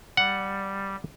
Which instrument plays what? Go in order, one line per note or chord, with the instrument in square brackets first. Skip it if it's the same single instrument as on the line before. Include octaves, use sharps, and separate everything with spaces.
[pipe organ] G3 [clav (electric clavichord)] F#5